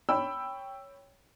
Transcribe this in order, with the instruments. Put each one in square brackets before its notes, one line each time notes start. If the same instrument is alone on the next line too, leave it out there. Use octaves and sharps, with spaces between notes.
[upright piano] C#5 G5 B5 E6